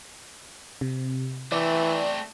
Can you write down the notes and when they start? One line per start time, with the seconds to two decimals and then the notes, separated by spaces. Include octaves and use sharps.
0.81 C3
1.52 E3 A3 C4 D5